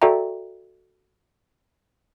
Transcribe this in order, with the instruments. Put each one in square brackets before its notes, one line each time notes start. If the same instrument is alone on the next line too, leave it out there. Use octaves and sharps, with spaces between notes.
[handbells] F#4 A4 D5 E5 G5 A#5